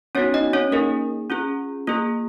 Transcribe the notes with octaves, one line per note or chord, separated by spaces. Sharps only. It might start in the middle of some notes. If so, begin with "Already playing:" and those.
B3 C#4 D#4 F#4 C#5
D#4 D#5
C#4 C#5
A#3 D#4 G#4 A#4
C#4 F4 G#4
A#3 F4 G#4